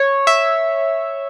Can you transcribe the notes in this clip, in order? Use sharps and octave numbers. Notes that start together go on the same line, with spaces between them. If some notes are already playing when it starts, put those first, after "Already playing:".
Already playing: C#5
E5